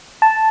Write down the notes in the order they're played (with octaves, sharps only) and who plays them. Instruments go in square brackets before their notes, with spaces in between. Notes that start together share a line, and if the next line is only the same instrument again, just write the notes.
[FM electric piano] A5